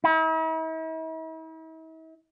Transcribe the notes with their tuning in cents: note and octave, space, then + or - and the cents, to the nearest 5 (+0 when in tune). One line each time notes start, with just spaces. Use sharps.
E4 -45